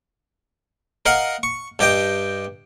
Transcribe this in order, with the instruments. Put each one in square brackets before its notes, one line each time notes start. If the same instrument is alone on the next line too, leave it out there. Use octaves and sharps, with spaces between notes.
[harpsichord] A#4 D#5 F5 F#5
C#6
G2 G4 D#5 G5